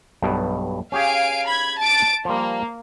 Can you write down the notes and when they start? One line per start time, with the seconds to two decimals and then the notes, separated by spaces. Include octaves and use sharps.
0.22 B1 G2 B2
0.92 C#4 G4 G#4 F5 G#5 D7
1.46 B5 G#6
1.79 A5 A6 D7
2.25 F3 G3 A#3